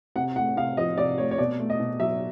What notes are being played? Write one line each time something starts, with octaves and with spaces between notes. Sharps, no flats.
C3 F#5
A3 F#5
C3 F5
F3 D#5
C3 D5
A3 C#5
C#5
B2 D5
A3
D#5
B2
F#3 E5